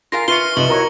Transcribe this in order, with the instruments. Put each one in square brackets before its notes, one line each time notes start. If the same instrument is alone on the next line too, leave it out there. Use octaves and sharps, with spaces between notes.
[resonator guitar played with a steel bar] F4 A#4 F5 [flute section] G#5 [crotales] A#6
[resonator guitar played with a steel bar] F4 [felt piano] B4 [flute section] E5 C#6 F6 [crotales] C#7 D#7 G7
[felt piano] C2 [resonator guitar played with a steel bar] F3 D#5 E5 [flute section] F4 B4 [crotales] F#7
[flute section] E4 F#4 C#5 [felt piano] A#4 A#5 C#6